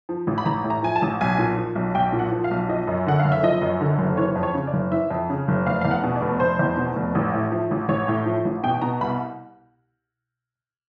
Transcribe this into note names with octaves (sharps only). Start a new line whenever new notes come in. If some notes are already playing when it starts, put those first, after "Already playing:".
F3
A1
B5
A1 A#5
A2
A#5
F3 G#5
A5
A1
B1 G#5
A#2
F3
B1
B1 G5
A#2
F#5
F3
F5
B1
F3 D#5
F#2
D3 F#5
F5
F#1
E5
F3 D#5
F#2
D3
F#1
E3 C#5
F2
C#5
C#3
D5
F#1
E3 E5
F2
C#3
F#1
F1 F5
E2 F5
F#5
B2
D5
F1
F1 C5
E2
B2
F1
A1
A2
F3
A1
A1 C#5
A2
F3
A1
B2 G5
B2 A#5
C2 B5